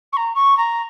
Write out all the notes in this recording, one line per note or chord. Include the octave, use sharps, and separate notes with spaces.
C#6
A#5
C#6
A#5